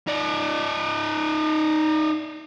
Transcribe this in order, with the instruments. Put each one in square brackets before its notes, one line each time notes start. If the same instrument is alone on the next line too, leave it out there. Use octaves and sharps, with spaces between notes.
[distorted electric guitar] D#4 D5